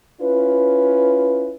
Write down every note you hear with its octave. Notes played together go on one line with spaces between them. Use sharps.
C#4 E4 F4 B4